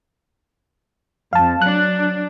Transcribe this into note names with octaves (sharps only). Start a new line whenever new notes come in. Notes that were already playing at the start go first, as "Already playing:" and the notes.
F2 F5 A5
F#3 D4 F#6